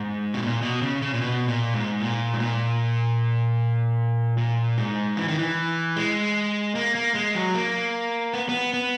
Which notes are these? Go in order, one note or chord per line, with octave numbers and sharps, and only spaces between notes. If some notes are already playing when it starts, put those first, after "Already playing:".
Already playing: G#2
B2
A#2
B2
C#3
C#3
A#2
B2
A#2
G#2
A#2
G#2
A#2
A#2
G#2
E3
D#3
E3
G#3
A#3
A#3
G#3
F#3
A#3
B3
B3
B3